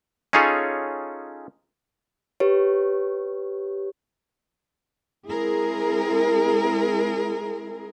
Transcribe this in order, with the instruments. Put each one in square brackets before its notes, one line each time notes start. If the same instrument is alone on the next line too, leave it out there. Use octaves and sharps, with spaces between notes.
[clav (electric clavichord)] C#4 D#4 F4 G#4 A4 C#5
[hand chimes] G4 B4 C#5
[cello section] G#3 C4 E4 G#4 A#4